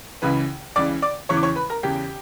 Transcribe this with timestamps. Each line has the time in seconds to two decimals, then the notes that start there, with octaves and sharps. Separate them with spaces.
0.22 C#2 C#3 E3 B4 B5
0.76 C#2 C#3 E3 D5 D6
1.02 D5 D6
1.29 E2 C#3 E3 C#5 C#6
1.37 D6
1.43 C#5 C#6
1.56 B4 B5
1.70 A#4 A#5
1.83 E2 C#3 E3 G4 G5